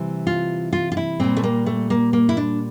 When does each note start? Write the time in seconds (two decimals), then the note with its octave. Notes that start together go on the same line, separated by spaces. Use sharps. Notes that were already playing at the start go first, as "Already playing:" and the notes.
Already playing: C3 E3 G3
0.27 F4
0.73 F4
0.92 F4
0.97 E4
1.20 A#2 G3 C4
1.37 A3
1.43 A#3
1.66 A3
1.90 A#3
2.13 A#3
2.29 E4
2.37 D4